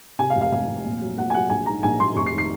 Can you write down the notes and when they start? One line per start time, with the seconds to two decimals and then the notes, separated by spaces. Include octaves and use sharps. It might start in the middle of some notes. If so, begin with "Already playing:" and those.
0.19 C3 G#5
0.30 F5
0.36 F1
0.41 F5
0.52 F1 F5
0.68 F1
0.85 A#2
1.02 F#3
1.17 A#2 F#5
1.30 G#5
1.34 F#3 F#5
1.50 A#1 G#5
1.66 G#2 A#5
1.83 A#1 G#5
2.00 A#1 C6
2.16 F1 C#6
2.26 C7
2.33 D#3
2.38 C7